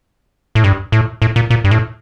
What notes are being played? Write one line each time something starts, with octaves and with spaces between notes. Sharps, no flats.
A2
G2
A2
A2
A#2
A#2
G2
A2